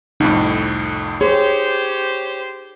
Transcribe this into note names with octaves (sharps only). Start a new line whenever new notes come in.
C2 F2 A2 D#4
G4 G#4 C5 C#5